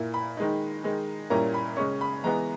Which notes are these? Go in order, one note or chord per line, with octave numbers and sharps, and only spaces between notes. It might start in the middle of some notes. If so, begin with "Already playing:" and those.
Already playing: A#2 A#3 E4
B5
D#3 G#3 D#4
D#3 G#3 D#4
A#2 G3 A#3 C#4 E4 A#5
B5
C#3 G#3 C#4 C#6
B5
E3 G#3 B3 A#5